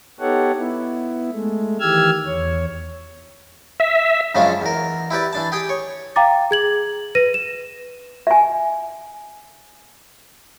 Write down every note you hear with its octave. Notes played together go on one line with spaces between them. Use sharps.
B3 D#4 G4 A4 C#5 F#5
B3 E4
G#3 A3
D#3 E3 G4 E6 F6 G#6
E2 C#5
E5
F#2 C#3 F3 G#3 C#4 D4
E2 A#4
E4 G4 B4 D5
E3 D4 A5
G4 G#4 G5
C#5
F5 G5 A#5 D6 A6
G#4 G#6 F#7
B4 A#6 D#7
E7
E5 G#5